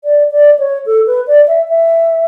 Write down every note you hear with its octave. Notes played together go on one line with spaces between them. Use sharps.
D5
D5
C#5
A4
B4
D5
E5
E5